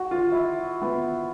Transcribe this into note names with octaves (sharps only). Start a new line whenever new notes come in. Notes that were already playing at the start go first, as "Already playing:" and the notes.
Already playing: F#4
F4
E4
B3